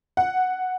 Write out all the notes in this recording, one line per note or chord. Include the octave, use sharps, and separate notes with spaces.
F#5